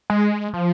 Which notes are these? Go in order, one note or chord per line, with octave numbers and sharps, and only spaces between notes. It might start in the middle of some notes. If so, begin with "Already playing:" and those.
G#3
F3